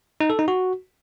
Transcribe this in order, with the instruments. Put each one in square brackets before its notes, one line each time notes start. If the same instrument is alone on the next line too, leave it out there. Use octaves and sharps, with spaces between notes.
[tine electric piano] D#4
A4
D#4
F#4